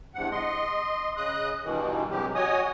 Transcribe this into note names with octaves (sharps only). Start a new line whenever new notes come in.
E2 G2 C3 F#5
D#5 C6
C#3 D#5 D#6 F#6
G2 B2 D#3 E3
C3 F#3 G#3 G4
F#4 C#5 D#5 G#5 D#6